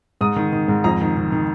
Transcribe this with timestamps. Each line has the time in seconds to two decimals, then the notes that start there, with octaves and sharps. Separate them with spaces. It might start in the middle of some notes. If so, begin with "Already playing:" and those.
0.21 G#2 D#6
0.36 D#3
0.52 D#3
0.68 G#2
0.84 F2 A#5
1.01 D#3
1.17 D#3
1.32 D#3